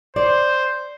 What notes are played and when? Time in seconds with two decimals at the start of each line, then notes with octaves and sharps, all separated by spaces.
0.16 C5 D5